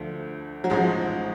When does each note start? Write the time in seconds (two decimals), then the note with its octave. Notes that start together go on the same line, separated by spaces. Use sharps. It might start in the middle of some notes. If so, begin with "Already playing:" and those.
Already playing: D2 D3 F3 A3
0.64 F#3
0.70 A1 G#2 F3 G#3